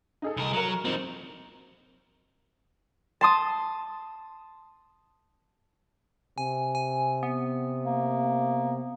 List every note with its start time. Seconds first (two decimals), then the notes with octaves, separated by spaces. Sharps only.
0.22 D#4 G#4 A4
0.37 C2 A#4
0.53 F#3 A#4 A#5
0.85 F2 C4 D#4
3.21 A5 C6 D#6
6.38 C3 G#5
6.75 G#5
7.23 B3
7.85 A#3